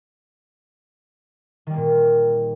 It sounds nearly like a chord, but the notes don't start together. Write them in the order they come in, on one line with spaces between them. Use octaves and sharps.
D#3 G3 A#3 A#2